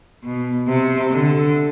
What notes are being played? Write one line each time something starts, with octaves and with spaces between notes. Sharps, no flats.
B2
C3
D3